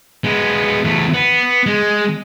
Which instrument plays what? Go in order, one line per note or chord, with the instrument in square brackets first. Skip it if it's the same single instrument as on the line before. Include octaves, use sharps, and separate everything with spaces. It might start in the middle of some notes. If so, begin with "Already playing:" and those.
[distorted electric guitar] G#3 B3
E2 A3
B3
G#3